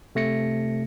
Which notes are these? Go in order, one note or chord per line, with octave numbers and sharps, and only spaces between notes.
C3 A3 A#6 C#7